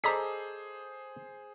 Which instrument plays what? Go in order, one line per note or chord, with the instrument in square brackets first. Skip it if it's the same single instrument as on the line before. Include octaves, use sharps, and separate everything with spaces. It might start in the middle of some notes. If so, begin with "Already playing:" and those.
[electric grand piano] G#4 C5 [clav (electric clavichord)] A4 D5 D#5 [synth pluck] A#5 B6